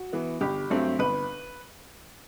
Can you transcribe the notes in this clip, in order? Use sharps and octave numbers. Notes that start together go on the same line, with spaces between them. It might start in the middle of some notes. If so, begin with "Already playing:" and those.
Already playing: F#4
E3 B3
G1 G4
G2 F#3 A3 C4
G1 B4